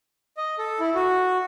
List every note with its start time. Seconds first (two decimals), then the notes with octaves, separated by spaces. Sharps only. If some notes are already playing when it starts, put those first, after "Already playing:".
0.37 D#5
0.58 A4
0.80 E4
0.95 F#4